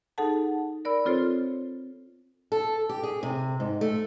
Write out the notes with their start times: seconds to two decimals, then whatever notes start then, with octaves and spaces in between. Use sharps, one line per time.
0.18 D#4 G#4 A4 F#5 A5
0.85 A#4 D5 B5 E6
1.06 C4 F4 A4 C5 C#5
2.52 A4
2.89 G4
3.03 G#4
3.23 C3
3.60 G#2
3.81 A3